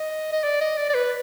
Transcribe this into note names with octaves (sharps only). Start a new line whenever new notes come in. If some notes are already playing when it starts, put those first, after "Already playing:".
Already playing: D#5
D#5
D5
D#5
D5
D5
B4